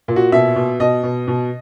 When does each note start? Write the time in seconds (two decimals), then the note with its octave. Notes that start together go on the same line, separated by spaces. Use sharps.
0.08 A#2
0.16 F#4
0.32 B2 E5
0.56 B2
0.80 B2 D#5
1.03 B2
1.28 B2